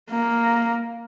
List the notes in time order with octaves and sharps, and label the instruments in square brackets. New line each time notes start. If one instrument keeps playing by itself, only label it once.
[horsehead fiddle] A#3